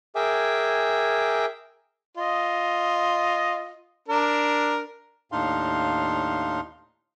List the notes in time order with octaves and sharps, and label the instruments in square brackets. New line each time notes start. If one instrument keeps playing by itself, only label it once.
[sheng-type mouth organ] G#4 A#4 E5 G5 G#5 D6
[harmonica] F4 D#5
D4 A#4
[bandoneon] D#2 A2 D4 D#4 F5 C6